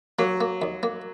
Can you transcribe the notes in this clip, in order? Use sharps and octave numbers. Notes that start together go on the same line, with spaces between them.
F#3 A#3
A#3
D#2
A#3